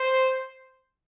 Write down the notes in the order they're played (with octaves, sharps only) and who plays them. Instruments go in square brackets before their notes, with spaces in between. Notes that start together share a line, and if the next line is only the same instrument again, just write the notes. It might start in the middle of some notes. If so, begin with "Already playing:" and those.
Already playing: [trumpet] C5